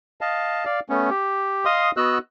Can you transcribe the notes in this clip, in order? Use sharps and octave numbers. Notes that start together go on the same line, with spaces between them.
D#5 F5 A5
D5 F5
A3 B3 C#4
G4
D#5 F5 C6 D#6
B3 F#4 D#5 E6 F#6